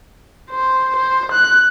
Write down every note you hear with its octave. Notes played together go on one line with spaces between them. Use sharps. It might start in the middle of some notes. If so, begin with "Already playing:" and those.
C5
C5
F#6